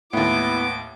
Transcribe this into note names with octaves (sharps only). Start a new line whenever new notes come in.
D#2 A2 B3 E4 D6